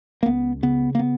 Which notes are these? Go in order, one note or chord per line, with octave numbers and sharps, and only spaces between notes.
A#3
C#2 B3
C#3 B3
A#3
B3